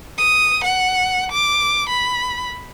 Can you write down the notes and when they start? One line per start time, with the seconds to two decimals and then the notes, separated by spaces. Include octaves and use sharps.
0.18 D#6
0.64 F#5
1.32 D6
1.89 B5